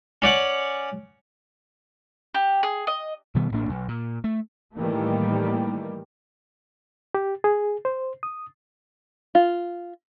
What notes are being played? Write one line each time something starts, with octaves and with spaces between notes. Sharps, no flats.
C#4 D5 F#5
G4
G#4
D#5
B2 D#3 G3 B3
A1 A2 A#3 D4
B1
A#2
A3
A2 D#3 E3 G3 A3 A#3
G4
G#4
C5
D#6
F4